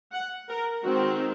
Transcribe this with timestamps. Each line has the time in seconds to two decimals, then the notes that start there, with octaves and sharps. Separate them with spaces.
0.12 F#5
0.49 A#4
0.83 D#3 G#3 C4 F#4